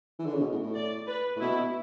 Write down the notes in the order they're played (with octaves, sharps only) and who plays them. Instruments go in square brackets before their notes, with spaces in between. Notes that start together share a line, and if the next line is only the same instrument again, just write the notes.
[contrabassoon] E3
D3
C#3
B2
A2
A2
[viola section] D5
B4
[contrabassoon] A2
[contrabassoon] B2 [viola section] E4
[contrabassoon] B2